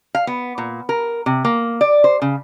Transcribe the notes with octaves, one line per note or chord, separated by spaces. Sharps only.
F5
B3
A#2
A#4
C3
A#3
D5
C5
C#3